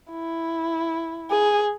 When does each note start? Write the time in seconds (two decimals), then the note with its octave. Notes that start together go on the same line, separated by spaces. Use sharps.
0.11 E4
1.30 G#4